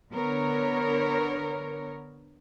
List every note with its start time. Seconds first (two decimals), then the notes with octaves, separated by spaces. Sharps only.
0.11 D3 B3 A#4 C#5